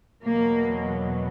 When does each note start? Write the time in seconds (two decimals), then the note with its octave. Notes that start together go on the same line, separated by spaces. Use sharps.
0.23 E2 B2 F#3 A#3